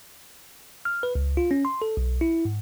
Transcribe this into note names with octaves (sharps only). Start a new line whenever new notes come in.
F6
B4
C#2
F4
C#4
C6
A4
B1
E4
G#2